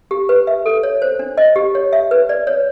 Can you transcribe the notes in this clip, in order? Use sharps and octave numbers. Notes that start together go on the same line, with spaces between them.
G4
B4
E5
A4
C#5
C5
D4
D#5
G4
C#5
E5
B4
D5
C#5